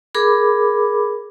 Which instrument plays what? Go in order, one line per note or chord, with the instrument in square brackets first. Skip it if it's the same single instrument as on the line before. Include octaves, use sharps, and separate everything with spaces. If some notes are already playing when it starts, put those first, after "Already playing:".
[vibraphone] G#4 A#4 B5 D6